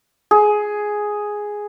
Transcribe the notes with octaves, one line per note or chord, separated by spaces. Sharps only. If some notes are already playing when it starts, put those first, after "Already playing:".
G#4